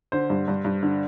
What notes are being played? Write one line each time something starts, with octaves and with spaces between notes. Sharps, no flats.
D3 C5
G2
G2
G2
D3